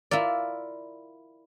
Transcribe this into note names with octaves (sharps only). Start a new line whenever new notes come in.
E4 F4 A#4 D5